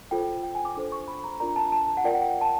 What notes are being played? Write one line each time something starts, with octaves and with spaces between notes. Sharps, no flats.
F4 A4 C5 G5
G5
G#5
D6
D4 F4 A4 C5 D6
C#6
B5
A#5
D4 F4 A#4 D5 A#5
A5
A5
F#5
F4 A#4 D5 G5
F#5
G5
A5